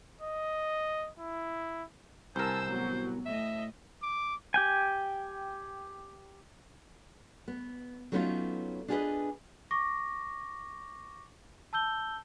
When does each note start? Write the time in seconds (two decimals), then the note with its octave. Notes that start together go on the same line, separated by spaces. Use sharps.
0.22 D#5
1.19 E4
2.36 C2 A#4 C5 G#5 A5 E6
2.67 A1 F#3 B3
3.26 A2 D#5 E5
4.02 D6
4.54 G4 G5 G#5
7.48 B3
8.12 F#3 A3 B3 C#4 D#4 F4
8.88 D4 F4 G#4 A4 B4 D#5
9.71 C#6 D6 A#6
11.73 A5 E6 G6 G7